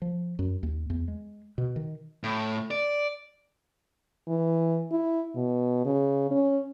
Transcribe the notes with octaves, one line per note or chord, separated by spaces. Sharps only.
F3
F#2
D#2
E2
G#3
B2
D#3
A2
D5
E3
E4
B2
C#3
C#4